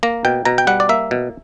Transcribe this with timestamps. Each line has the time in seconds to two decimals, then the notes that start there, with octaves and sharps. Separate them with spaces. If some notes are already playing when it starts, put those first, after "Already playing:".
0.03 A#3 A#5
0.25 B2 G5
0.45 B2 A#5
0.58 G5
0.67 G3 F#5
0.80 D5
0.89 A#3 E5
1.11 B2